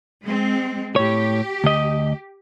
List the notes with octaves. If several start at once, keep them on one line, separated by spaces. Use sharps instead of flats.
G#3 C4
A2 G4 C#5
D2 D#5